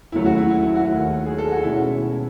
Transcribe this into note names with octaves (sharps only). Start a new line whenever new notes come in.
D#2 C#3 F#3 A3 E4
F#4
E4
E4
E4
F#4
D#2 D#3 A3
G#4
A4
F#4
B2 G#3 C#4 E4